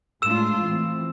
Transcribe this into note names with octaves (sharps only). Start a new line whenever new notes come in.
A2 G#3 D4 F4 E6 E7
E3 A3 C4